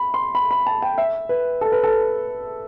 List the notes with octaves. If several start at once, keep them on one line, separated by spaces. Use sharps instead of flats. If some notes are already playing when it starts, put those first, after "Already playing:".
Already playing: B5
C6
B5
B5
A5
G5
E5
B4
A4
B4
A4